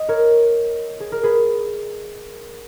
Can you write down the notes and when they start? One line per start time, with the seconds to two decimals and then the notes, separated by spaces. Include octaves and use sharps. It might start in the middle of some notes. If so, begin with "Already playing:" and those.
Already playing: D#5
0.09 A#4 C#5
1.00 G#4
1.12 A#4
1.23 G#4 B4